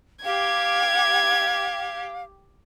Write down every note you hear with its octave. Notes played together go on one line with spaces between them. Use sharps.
G4 F5 G#6